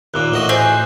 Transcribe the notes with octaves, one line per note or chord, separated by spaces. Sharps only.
D#2 A#2 D6 E6 F#6
A1 F#4 D#5 G7
C4 G#4 G6